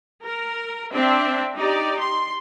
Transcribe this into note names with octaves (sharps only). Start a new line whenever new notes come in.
A#4
C4 D4 E5
D#4 G4 D5
C6